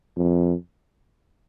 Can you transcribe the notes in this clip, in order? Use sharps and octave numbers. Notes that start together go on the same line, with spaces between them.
F2